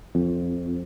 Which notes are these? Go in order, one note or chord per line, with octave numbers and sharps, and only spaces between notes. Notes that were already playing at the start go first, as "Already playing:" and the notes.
F2